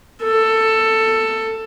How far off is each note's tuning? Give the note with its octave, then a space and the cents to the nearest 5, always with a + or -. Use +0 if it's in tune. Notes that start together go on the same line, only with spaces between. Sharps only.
A4 +10